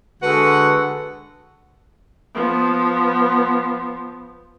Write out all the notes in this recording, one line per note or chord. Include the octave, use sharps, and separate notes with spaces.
D3 G#3 F#4 A4 B4 F#5
F3 B3